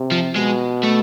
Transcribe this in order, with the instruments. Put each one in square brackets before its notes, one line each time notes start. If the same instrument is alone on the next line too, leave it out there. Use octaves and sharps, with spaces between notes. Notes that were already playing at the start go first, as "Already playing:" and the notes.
Already playing: [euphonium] C3
[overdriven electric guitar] F3
[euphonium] B2 [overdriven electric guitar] G#3
[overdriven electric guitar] A3